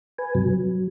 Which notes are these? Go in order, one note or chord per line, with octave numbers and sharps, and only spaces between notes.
B4 G#5
G2 C3 F#3
F#3